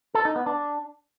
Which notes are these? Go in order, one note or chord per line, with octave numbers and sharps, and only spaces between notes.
A4
D#4
B3
D4